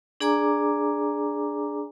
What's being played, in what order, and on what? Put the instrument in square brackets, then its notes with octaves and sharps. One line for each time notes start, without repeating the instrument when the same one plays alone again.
[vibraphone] D4 G#4 D5 G#5 A#5 D6